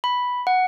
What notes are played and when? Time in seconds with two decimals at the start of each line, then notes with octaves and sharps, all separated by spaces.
0.04 B5
0.47 F#5